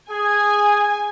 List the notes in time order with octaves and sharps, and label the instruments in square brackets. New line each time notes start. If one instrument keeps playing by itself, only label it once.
[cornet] G#4 [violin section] G#5